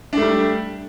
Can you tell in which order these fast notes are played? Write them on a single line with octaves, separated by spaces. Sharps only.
D4 A3 G3